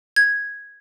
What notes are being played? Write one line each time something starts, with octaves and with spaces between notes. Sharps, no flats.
G#6